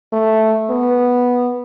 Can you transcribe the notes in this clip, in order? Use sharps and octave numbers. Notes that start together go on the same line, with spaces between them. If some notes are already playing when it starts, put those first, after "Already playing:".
A3
B3